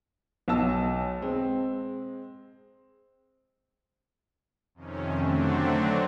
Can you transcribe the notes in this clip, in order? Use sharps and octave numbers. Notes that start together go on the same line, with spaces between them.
B1 B2 A5 E6
G#3 C4
F2 C3 D#3 C#4
D3 F#3 A3 C4 D4